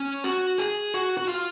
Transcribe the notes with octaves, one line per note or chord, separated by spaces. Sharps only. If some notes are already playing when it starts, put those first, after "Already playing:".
Already playing: C#4
F#4
G#4
F#4
F#4
F4